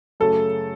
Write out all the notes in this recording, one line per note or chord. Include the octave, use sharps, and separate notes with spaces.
F#2 C#3 A3 A4